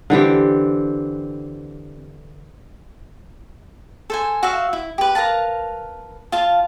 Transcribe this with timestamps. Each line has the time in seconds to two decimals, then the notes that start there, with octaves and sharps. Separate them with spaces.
0.10 D3 E3 C4 G4
4.10 A4 C5 G#5
4.43 F#4 E5 F5
4.73 E4
4.98 G4 B4
5.15 A#4 B4 F5 A5
6.32 F4 F5 A5